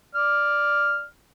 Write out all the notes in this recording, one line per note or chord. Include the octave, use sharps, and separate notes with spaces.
D5 F6